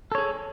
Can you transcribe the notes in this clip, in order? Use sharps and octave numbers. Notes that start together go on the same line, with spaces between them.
G#4 A4 C#5